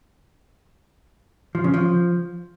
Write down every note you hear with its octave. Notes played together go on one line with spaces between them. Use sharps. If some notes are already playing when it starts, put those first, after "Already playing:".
F3
C#3
F3